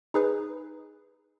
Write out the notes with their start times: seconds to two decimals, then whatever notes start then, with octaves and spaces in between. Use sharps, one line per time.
0.14 D#4 G#4 B4